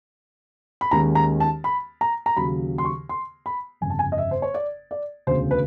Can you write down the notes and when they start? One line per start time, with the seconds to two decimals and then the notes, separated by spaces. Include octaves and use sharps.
0.81 B5
0.91 D#2 D#3 G#3 C#4 A#5
1.15 A#5
1.40 A5
1.64 B5
2.01 A#5
2.26 A#5
2.37 D#2 C#3 F#3 B5
2.78 C6
2.85 C#6
3.09 C6
3.46 B5
3.81 G1 F2 C#3 G#5
3.90 A5
3.99 G#5
4.12 D#5
4.18 E5
4.31 C5
4.42 C#5
4.54 D5
4.91 D5
5.27 E1 D2 C#3 C5
5.51 B4